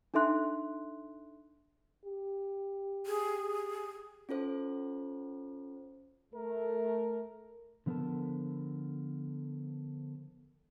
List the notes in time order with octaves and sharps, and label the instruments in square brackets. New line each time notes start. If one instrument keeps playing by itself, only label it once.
[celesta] D4 D#4 A4 E5 C6 F#6
[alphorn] G4
[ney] G#4
[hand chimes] C#4 F4 A4 C5
[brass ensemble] A3 A#4
[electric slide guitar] D3 F3 B3 A4 A#4 A5